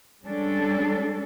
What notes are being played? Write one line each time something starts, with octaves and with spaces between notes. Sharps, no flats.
G3 G#3 C#4 D4 A4